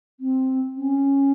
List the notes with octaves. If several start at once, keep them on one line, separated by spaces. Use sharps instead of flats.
C4
C#4